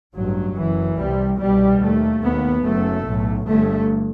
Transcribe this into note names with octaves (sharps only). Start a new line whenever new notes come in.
A1 G2 F#3
F#1 F#2 E3
C2 C3 G3
C2 B2 G3
D#2 A3
D#2 B3
F#1 F#2 A3
B1 A2
G1 G2 A3